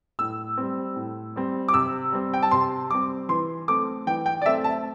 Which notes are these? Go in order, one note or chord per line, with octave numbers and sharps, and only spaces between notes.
A2 E6
G3 C4
A2
G3 C4
D6
C3 E6
G3 C4
G5
A5
C3 C6
G3 C4 D6
E3 C6
A3 C4 D6
E3 G5
G5
D5
A3 C4 E5
A5